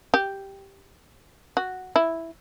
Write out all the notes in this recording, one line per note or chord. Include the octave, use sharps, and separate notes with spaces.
G4
F#4
E4